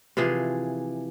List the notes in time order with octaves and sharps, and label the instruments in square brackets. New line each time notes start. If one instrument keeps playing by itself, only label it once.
[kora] C3 E3 F3 G#4